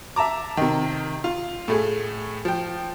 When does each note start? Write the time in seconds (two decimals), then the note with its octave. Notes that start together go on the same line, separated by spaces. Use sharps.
0.16 E5 A5 A#5 D6
0.57 C3 D#3
1.24 F4
1.68 A2 A3 G#4
2.45 F3 G5